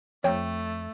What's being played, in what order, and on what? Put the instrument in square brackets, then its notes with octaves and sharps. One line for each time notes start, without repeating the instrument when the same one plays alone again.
[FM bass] F2 [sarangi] A3 [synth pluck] C#5 G5